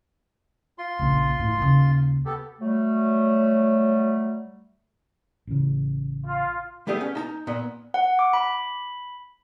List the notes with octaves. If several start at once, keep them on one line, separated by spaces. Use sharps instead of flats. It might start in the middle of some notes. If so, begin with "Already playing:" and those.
F4 C6
A#1 C#3
A2 E4
D#2 C#3
B3 G4 A4
F#3 G3 A3
A1 C#3
F4
G3 A3 B3 G4 G#4
C#4
D#4 A5 A#5
A#2 B3
F#5
D6
B5